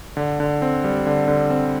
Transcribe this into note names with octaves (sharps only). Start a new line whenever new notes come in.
D3
D3
C4
G3
D3
D3
C4